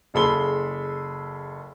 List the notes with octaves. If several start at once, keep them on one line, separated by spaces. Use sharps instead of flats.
F#1 G#4 A4 B5 C6 G7